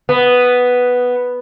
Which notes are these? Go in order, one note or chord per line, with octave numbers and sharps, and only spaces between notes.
B3